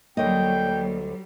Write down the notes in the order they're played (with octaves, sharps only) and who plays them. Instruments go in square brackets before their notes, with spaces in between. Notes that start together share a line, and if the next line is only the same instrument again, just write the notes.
[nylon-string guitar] D2 D#5 [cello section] F#3 G3 [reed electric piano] A#3 C#5 [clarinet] G5